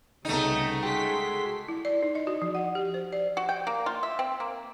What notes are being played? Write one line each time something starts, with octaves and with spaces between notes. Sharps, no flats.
C2 C#3 A3 B3 D#4 D#5 G5
G#3 F#4 G#4 A4 G5 C6 B6
E4
D5
D#4
D#5
F#4
F3
F#5
G4
C5
D5
F#4
G5
A#3
F4
E5
C4
A#3